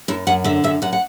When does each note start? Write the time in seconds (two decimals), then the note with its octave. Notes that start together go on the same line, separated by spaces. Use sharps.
0.08 F#2 E4
0.27 F#2 F#5
0.44 D3 E5
0.64 F#2 E5
0.82 F#2 F#5
0.93 F#5